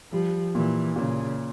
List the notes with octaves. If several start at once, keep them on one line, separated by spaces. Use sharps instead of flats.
F3 G3
A#2 E3
A#2 C#3